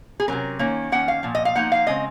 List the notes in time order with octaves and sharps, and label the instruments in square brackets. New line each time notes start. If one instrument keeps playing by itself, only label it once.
[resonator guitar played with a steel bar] G#4
C3 F#3 C#4 A#4
D#3 A#3 C#4
D#3 A#3 C#4 F#5
F5
A#2 F3
D#5
F5
F3 A#3 D#4 F#5
F5
C#3 G#3 C4 D#5